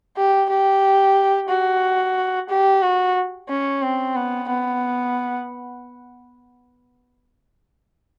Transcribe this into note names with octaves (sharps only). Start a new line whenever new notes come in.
G4
G4
F#4
G4
F#4
C#4
C4
B3
B3